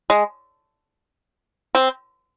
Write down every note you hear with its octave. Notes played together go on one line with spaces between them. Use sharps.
G#3
C4